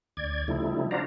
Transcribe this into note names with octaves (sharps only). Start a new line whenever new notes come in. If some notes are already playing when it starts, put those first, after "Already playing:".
D2 D5 G#6
C#3 F3 G3 A3 D#4 E4
D4 F#4 C5 D5 F5 A#5